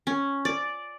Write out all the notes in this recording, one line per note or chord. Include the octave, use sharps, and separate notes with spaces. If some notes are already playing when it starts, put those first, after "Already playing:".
C#4
D5